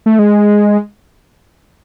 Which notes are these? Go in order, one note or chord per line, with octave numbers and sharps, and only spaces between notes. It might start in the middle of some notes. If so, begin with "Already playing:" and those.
A3
G#3